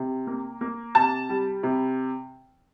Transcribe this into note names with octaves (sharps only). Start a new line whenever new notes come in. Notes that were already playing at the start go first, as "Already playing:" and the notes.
Already playing: C3
A#3
A#3
C3 A5
G3
C3